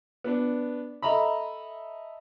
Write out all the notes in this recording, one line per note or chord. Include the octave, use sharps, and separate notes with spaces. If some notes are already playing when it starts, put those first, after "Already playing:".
B3 D4
A4 D#5 E5 A#5 B5